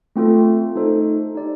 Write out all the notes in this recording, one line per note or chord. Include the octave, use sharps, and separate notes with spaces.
A3 C4 F4 A4
A3 D#4 A4 C5
D#4 G4 D5